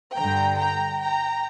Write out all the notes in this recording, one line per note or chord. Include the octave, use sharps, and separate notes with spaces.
G2 D3 G5 A#5
G5 A#5
G5 A#5